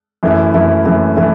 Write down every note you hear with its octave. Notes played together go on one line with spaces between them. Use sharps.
F#2 E3 A3 E4
F#2 E3 A3 E4
F#2 E3 A3 E4
E3 A3 E4